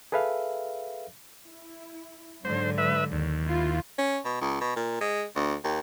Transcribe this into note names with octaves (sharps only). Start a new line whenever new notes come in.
G#4 A4 B4 E5 F5
E4
G#2 D3 F#3 C5
B4 E5
D#2
E4 F4
C#4
B2
C#2
B2
A#2
G#3
D2
D#2